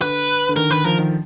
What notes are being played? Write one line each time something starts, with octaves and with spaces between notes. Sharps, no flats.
D3 B4
D3
D#3 A#4
D#3 B4
F3 A#4
D#3